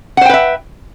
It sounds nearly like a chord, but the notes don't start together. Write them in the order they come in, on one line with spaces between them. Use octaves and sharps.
F#5 C5 G5 B4 E5